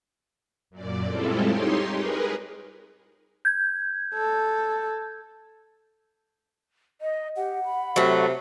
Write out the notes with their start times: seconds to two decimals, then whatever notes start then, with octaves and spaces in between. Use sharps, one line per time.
0.70 F#2 A#2 D5
1.06 G3 G#3 C4 E4 F4 A4
1.42 D#4 G4 C#5 C6
1.89 G#4 A#4 B4
3.45 G6 G#6
4.15 A4
7.01 D#5
7.36 G4 F#5
7.64 B5
7.96 C3 F#3 A3